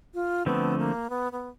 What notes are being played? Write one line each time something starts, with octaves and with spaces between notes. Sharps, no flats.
F4
D3 F3 A3 B3 C4
A#3
B3
B3